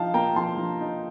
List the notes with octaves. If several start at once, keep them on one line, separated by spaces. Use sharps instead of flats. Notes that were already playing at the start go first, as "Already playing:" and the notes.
Already playing: F3 D#4 F5 G5 A5
A#3 G5 A#5
F3 A5 C6
F3
D#4